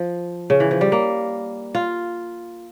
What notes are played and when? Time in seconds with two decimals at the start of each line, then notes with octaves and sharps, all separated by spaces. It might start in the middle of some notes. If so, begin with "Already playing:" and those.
Already playing: F3
0.50 C#3
0.60 E3
0.71 F3
0.81 G3
0.92 A#3
1.75 F4